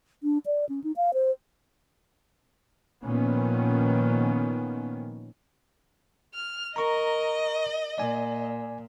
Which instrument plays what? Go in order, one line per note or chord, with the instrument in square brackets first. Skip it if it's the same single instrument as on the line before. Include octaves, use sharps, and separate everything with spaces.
[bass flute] D4
D5
C#4
D#4
F5
C5
[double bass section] A#2 D#3 F3 B3 C#4
[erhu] F6
[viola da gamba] A#4 [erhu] D#5 [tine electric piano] A#5 C#6
[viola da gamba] A#2 [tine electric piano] D5 G#5